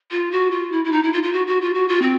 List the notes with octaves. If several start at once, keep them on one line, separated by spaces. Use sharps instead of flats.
F4
F#4
F4
E4
E4
D#4
E4
F4
F4
F#4
F#4
F4
F#4
F4
C4